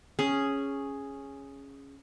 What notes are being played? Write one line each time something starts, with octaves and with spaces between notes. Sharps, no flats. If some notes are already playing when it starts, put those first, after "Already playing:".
C#4 G#4